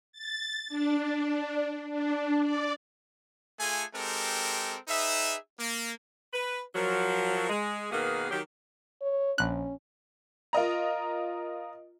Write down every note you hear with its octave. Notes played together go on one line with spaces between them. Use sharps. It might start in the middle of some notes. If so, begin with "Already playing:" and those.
A6
D4
D4
D5
A3 F4 G#4 A4 G#5
G#3 C4 G4 A4 A#4
D#4 G#4 B4 E5
A#3
B4
F3 F#3 A#4
G#3
B2 D#3 A#3 B3 G#4 B4
D#3 F#3 G4
C#5
A#1 C#4 F#6
F4 A#4 D#5 A#5